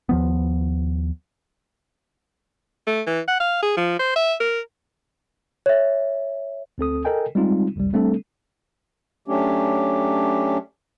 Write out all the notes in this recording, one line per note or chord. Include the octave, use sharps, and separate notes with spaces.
D#2 F3 B3
A3
E3
F#5
F5
G#4
F3
C5
E5
A#4
C#5 E5
D2 C4 A4 D#6
A4 A#4 D#5 G5 G#5
G3 G#3 C4 D#4 F4
G1 C2 F2 G3
G3 A3 C4 D4 A4
F#3 A3 C#4 D4 G4